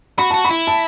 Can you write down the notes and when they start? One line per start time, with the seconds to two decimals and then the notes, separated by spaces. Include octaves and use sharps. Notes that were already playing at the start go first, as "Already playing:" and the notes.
0.18 F#4 B5
0.30 F#4 A5
0.45 B5
0.51 E4
0.67 A5